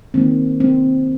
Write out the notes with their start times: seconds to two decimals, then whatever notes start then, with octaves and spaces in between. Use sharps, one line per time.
0.14 D#3 A#3 C4
0.60 C4